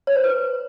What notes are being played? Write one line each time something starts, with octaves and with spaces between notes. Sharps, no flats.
C#5
C5
B4